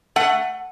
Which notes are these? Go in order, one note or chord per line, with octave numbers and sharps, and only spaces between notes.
A3 F#5